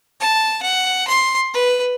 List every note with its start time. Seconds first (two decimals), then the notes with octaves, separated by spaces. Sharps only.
0.21 A5
0.63 F#5
1.07 C6
1.54 B4